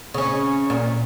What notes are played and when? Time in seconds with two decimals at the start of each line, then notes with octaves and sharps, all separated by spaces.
0.14 C#3 C#4
0.70 A#2